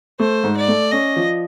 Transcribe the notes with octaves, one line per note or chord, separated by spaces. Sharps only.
A3 C5
G#2
D5
A3
C#4 D#5
F3